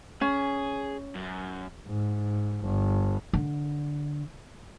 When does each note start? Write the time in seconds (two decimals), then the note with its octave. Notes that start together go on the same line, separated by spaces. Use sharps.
0.21 C#4 G#4
1.15 F#2
1.86 G#2
2.63 G1
3.33 D3